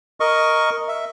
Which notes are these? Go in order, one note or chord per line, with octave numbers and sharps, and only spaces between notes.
A#4 D#5 C#6
E5